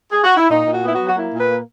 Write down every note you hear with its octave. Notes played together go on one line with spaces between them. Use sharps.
G#4
F#4
E4
A#2 D#4
A#2
F#4
B3 E4
F#4
F#3
F#4
A#3 E4
A#2
B4
A#3